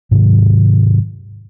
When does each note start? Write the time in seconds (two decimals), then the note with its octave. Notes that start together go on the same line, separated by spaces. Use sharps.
0.11 G#2 C3 D#3 F#3